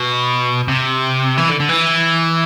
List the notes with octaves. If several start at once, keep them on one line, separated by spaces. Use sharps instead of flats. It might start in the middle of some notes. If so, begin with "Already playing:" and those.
Already playing: B2
C3
E3
D3
D3
E3